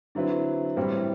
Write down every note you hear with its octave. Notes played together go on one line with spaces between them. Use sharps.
D3 F#3 C4 E4 B4
A2 E3 G3 C4 E4